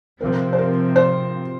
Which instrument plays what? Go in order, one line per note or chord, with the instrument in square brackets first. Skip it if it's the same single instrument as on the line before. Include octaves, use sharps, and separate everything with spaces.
[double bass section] C3 F3 C4 [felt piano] A#4
[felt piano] C5
A#4
C5